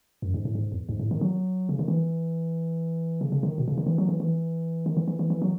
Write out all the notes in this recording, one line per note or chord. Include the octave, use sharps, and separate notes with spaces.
F#2
G#2
A2
G#2
E2
G#2
A2
D#3
F#3
C#3
D#3
E3
C#3
C#3
D#3
B2
C#3
D#3
E3
F#3
E3
E3
D#3
E3
E3
E3
E3
F#3